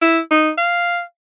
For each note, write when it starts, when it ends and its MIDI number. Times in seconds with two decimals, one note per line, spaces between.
0.02 0.19 64
0.31 0.50 63
0.58 1.00 77